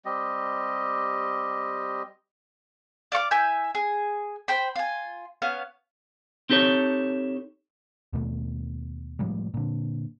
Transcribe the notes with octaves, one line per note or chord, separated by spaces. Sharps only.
G3 C4 G4 D#5
D5 F5 C#6 D6
E4 E5 G#5 G6
G#4
C5 G5 B5
F4 G#5
B3 C#4 F5
C4 D#4 G4 A4 C#5
D#2 B2 A3
A2 F3 G3 G#3
A#2 D3